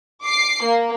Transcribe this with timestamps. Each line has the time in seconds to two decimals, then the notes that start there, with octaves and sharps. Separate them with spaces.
0.24 D6 C7
0.63 A#3